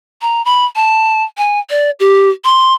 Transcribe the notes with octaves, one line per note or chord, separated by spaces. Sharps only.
A#5
B5
A5
G#5
D5
G4
C6